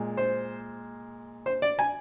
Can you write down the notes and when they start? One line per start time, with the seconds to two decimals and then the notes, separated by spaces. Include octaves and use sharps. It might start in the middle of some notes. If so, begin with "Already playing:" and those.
Already playing: A#2 G#3
0.17 C5
1.46 C5
1.62 D5
1.79 G#5